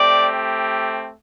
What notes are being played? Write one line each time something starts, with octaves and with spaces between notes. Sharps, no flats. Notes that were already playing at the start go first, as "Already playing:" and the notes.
Already playing: A3 C4 G4 D5